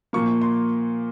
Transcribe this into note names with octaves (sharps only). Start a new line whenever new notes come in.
A#2 F3 A#3 C#6
C6